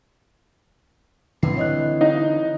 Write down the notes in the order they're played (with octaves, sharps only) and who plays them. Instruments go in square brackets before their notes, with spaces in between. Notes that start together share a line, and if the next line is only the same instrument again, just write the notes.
[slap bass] D3 C4 [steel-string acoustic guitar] E3 [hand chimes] C7
[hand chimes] C#5 D#5 F#6
[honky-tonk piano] D#4